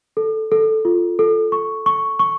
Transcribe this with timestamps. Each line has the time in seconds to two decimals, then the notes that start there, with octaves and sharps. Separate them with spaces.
0.17 A4
0.52 A4
0.85 F4
1.19 A4
1.52 C#6
1.86 C#6
2.19 C#6